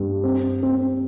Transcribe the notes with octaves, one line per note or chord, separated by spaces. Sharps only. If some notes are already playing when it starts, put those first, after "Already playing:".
Already playing: G2
C4
C4